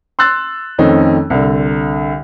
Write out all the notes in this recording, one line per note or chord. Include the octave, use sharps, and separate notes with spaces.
C6 E6 F#6 A6
F2 D#3 A3 C4 C#4 D#4
C2 D3